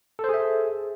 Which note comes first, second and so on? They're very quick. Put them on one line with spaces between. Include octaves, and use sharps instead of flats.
A4 C5 G#4 E5